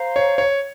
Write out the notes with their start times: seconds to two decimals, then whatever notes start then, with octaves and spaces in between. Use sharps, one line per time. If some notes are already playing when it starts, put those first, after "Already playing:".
Already playing: C5 F5 A#5
0.16 C#5
0.38 C#5